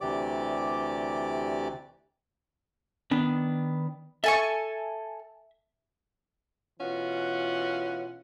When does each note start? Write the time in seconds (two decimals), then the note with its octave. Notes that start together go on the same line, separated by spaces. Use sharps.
0.01 D2 C3 E3 G4 D5 D6
3.11 D#3 B3 D4
4.24 A4 E5 G#5 C#6
6.80 B2 E3 C#4 F4 F#5